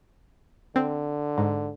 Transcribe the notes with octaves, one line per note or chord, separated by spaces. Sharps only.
D3 C4
G#2